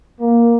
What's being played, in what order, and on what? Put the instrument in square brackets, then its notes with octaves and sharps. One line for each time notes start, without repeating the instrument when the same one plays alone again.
[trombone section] A#3